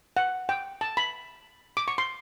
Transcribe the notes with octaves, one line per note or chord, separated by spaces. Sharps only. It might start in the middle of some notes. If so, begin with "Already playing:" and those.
F#5
G5
A5
B5
D6
C#6
C6